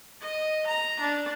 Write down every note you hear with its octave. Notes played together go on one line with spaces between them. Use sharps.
D#5
A#5
D4